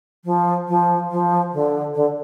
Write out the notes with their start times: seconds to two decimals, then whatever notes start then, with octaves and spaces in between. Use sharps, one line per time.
0.25 F3
0.68 F3
1.11 F3
1.53 D3
1.95 D3